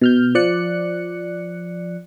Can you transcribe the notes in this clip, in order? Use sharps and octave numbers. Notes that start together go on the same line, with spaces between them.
B2 F6 G6
F3 D5 F#6 C#7